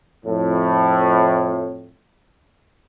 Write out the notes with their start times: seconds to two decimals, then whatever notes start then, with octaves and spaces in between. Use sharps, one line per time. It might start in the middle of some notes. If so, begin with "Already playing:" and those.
0.25 F2 A2